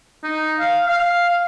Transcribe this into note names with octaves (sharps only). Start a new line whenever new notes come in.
D#4
F5
F5